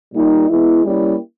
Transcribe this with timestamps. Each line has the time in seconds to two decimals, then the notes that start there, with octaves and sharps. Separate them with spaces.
0.13 A#2 G3 A#3 D#4
0.48 E3 G#3 B3 E4
0.84 G3 A#3 C#4 E4